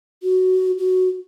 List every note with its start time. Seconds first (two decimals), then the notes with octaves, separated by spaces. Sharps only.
0.23 F#4
0.78 F#4